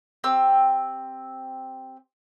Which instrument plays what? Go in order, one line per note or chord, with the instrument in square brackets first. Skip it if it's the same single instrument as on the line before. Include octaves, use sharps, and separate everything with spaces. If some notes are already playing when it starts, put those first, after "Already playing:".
[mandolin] C4 G4 E6